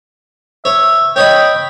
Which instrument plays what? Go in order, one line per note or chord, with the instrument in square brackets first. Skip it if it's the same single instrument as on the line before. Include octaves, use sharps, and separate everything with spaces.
[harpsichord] C#5 [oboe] E5
[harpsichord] C#5 D#5 B5 [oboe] G5